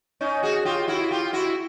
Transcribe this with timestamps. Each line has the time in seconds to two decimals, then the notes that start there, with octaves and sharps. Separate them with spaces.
0.21 C#4 D#4
0.43 F#4 G#4
0.65 F4 G4
0.88 E4 F#4
1.10 F4 G4
1.33 E4 F#4